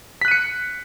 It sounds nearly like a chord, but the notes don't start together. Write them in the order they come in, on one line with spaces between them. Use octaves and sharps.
B6 F#6 D#7 C#7